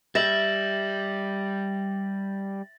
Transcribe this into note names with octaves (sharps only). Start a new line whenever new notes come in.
G3 E5 A6 A#6 F#7